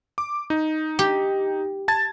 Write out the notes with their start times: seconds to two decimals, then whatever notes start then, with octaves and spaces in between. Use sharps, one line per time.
0.18 D6
0.50 D#4
0.99 G4
1.88 A5 G#6 A6